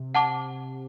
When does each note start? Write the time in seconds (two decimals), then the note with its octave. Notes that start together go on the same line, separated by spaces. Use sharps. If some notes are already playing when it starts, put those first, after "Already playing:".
Already playing: C3
0.15 F#5 A5 D6